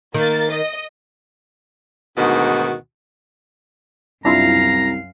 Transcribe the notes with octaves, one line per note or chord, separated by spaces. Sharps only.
D#3 A#3 A6
D#5
D2 G#2 B2 D#3 F#4
C2 F#2 D4 E4 F4 F5 A#5